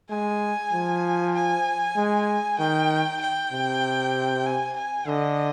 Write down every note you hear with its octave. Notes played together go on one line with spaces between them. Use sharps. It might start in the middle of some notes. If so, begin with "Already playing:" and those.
G#3 G#5
F3
G#5
G#3
D#3 G5
G5
C3
G#5
G#5
D3 D#5